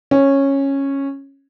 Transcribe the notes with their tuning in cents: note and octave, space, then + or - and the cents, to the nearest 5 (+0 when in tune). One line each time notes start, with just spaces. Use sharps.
C#4 -10